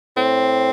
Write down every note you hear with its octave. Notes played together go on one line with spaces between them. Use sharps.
A2 C4